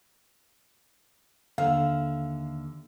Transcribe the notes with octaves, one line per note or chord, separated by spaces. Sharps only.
D#2 D3 E5 F5